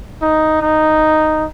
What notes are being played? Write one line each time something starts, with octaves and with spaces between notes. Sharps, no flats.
D#4
D#4